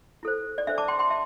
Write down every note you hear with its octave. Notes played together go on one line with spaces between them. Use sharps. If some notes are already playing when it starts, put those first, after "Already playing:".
E4 A4 C5
D5
D4 A4 C5 E5
A5 D6
G5 C6
G5 C6
E5 A5